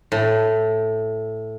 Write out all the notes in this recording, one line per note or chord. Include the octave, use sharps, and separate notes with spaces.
A2